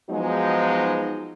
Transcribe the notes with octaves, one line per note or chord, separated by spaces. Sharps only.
F3 F#3 G#3 B3 D#4